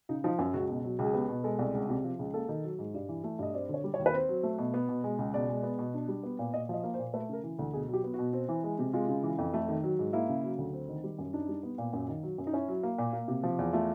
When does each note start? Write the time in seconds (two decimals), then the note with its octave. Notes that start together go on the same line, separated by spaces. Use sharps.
0.09 C#3 D#4
0.24 F3 D#4
0.39 F#2
0.54 C#2 F#4
0.69 B2
0.84 F#3
0.99 C#2
1.04 G#4
1.14 B3 G4
1.29 B2
1.44 G#3 A4
1.59 C2
1.74 C#2
1.89 C3
2.04 F3
2.19 C#2
2.34 A#3 A4
2.49 D#3
2.64 F#3
2.79 G#2
2.94 G2
3.09 E3
3.24 A3
3.39 G2 D#5
3.54 C4 D5
3.69 D3
3.74 C#5
3.84 G3
3.94 C#5
3.99 D#2
4.06 B4
4.14 C4 C5
4.29 F#3
4.43 A3
4.58 B2
4.74 B3
4.89 B2
5.04 G#3
5.19 C#2
5.34 B2 D5
5.49 G#3
5.63 B3
5.79 B2
5.94 D4
6.08 G3
6.23 B3
6.39 A#2
6.53 A#2 D#5
6.69 F3 D#5
6.84 A#3
6.94 C5
6.99 A#2
7.14 A3 B4
7.29 C#3 A#4
7.44 E3
7.59 D2
7.73 B2 G#4
7.89 F#3 G4
8.04 B3
8.14 B2 F#4
8.33 C4
8.49 E3
8.64 G#3
8.79 C3
8.93 G#3 F4
9.09 C#3
9.23 E3
9.39 F2
9.54 A3
9.69 D#3
9.83 F#3
9.99 G#2
10.13 A#3 E4
10.29 C#3
10.43 F#3
10.58 D2
10.73 C4
10.88 D#3
11.04 G3
11.18 F#2
11.33 D4 D#4
11.48 G3
11.63 B3
11.78 A#2
11.93 F#2
12.08 D#3
12.23 F#3
12.38 F#2
12.47 D#4
12.53 C#4 E4
12.68 F#3
12.83 A#3
12.98 A#2
13.13 A#3
13.28 C3
13.43 F3
13.59 E2
13.73 A3 F4